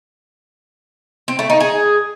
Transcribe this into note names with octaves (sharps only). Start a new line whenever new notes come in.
C4
A3
D#4
G#4